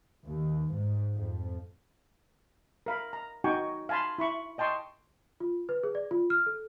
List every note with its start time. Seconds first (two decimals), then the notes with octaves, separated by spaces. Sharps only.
0.25 D#2
0.73 G#2
1.14 F2
2.86 A#4 F5 B5
3.13 A#5
3.44 D#4 F#4 G5 G#5 C#6
3.89 F5 G#5 A5 B5 C6
4.18 E4 B5 C#6
4.58 D#5 G5 A5 C6 C#6 D#6
5.40 F4
5.69 B4
5.83 G#4
5.95 D5
6.11 F4
6.30 F6
6.46 A4